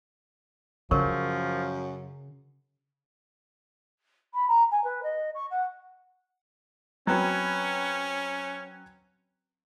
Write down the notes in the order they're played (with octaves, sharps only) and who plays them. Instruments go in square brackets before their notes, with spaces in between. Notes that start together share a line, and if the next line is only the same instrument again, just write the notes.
[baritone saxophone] F#2 [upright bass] C#3 [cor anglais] F3 [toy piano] A#4 C#5 C#6
[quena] B5
A#5
G#5
B4
D#5
C#6
F#5
[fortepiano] F#3 C4 B4 [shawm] C#4